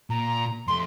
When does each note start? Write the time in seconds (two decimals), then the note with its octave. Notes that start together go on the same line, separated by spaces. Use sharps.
0.10 A#2 A#5
0.67 F2 A3 C6